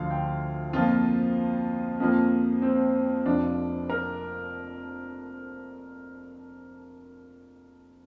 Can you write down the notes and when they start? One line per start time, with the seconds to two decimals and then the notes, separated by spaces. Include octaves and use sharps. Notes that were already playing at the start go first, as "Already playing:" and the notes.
Already playing: D2 D3 F3 F5
0.10 G5
0.73 F2 F3 A#3 F4
2.00 F2 F3 A#3
2.62 C4
3.25 F1 F2 F3 D4
3.90 A#4